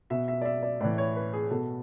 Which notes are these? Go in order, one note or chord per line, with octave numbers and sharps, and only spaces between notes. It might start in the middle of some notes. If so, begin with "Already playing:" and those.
B2 E5
E5
D5
E5
D5
A2 E3 D5
C#5
B4
G#4
B2 A4